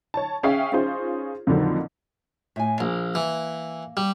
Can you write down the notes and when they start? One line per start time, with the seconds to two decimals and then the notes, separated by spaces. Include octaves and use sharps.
0.14 C#5 A5
0.43 C#4 G#4 E5 F5 G5
0.72 C#4 D#4 F4 G#4 C5
1.47 F2 A#2 D3 D#3 F3 F#3
2.56 A2 G#5
2.80 A#1 A#3
3.15 E3
3.97 G3